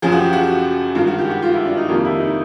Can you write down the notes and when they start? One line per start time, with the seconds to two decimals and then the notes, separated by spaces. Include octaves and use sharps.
0.02 F#2 C#3 F3 G#4
0.12 F#4
0.18 G4
0.33 F#4
0.95 G2 D#3 G#3 F4
1.07 F#4
1.18 G4
1.30 F#4
1.42 F4
1.54 E4
1.65 D4
1.77 D#4
1.88 F2 C3 D#3 G3 A#3 F4
2.05 E4
2.19 D#4